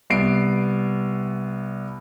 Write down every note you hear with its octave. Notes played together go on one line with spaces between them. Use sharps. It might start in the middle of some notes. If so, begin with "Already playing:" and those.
C2 B3 C7 D7